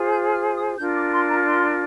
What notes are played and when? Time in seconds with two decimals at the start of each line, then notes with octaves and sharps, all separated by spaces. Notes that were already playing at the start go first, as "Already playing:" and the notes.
Already playing: F4 G#4 C5
0.10 G6
0.33 F6
0.55 D#6
0.78 D4 F4 A#4 G6
0.96 D6
1.13 C6
1.29 A#5
1.47 C6